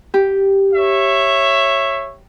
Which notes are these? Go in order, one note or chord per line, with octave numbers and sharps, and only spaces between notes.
G4
C#5 E5